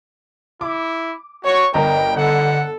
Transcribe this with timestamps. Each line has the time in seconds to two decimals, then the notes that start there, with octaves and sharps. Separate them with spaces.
0.61 E4 D6
1.45 F#4 C#5 C#6
1.74 G1 A#4 D#5 G5 A#5
2.16 D3 A4 F#5